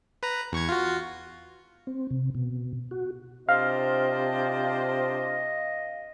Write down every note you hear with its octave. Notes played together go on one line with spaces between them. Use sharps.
B4 A#5
E2 C#6 G#6
F4 F#4
C4
C3
B2
F#4
C3 D4 F4 C5 D#5 F5